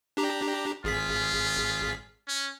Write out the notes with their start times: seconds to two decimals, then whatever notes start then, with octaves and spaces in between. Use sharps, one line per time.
0.17 D4 G4 A#5
0.84 G#1 F4 G#4 B6
2.28 C#4